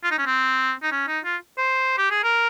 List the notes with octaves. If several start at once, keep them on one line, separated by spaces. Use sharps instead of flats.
F4
D#4
C#4
C4
D#4
C#4
D#4
F4
C5
G4
G#4
A#4